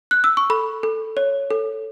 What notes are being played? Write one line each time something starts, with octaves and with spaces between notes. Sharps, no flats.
F#6
E6
C#6
A4 B5
A4
C#5
A4